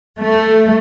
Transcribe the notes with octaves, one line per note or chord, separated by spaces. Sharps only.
A3